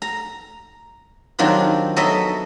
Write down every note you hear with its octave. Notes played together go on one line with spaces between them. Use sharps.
A#5
D#3 F#3 C4 D4 F4 G4
F#3 B3 A4 D#5 E5